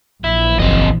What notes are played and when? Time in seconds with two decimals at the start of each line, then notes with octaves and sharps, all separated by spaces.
0.24 A#1 E3 E4
0.59 F#1 C4 D#5